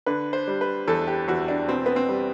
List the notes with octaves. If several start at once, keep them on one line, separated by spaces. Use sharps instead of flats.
D3 B4
C5
G3
B4
E2 A4
G4
E2 F#4
D4
B2 C4
B3
C4
G3